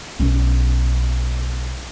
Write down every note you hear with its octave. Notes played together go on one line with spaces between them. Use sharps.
B1 C#4